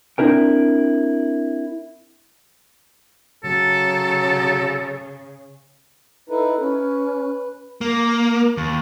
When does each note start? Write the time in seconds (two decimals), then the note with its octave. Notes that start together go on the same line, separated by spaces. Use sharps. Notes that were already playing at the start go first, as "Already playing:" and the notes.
0.18 C4 D4 E4 A#4 G5
3.44 C#3 F#3 A4
6.30 D#4 E4 A4 B4
6.60 C#4 B4
7.81 A#3
8.57 D#2